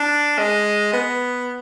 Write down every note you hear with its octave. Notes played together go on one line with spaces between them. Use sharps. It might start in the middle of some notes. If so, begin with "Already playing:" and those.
Already playing: D4
G#3
B3